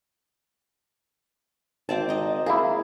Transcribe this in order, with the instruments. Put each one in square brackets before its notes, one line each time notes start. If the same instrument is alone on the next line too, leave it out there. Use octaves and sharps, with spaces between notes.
[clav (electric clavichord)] G#1 [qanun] C4 D5 A5
[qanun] D#5 A#5
[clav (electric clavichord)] A#3 E4 [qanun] G#4